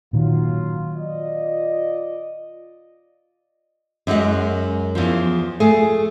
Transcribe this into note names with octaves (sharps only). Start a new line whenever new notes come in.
A#2 D#3 F#3 F4
F4 D5 D#5
F#2 F#3 G#3 F#5
E2 F3
A3 G#4